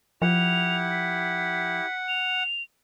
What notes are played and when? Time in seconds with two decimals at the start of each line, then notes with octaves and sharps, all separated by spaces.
0.22 F3 E4 G4 F#5 F7
0.90 B6
2.08 F7